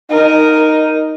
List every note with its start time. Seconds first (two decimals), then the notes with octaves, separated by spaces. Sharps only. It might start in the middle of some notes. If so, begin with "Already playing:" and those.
0.11 D#4 A#4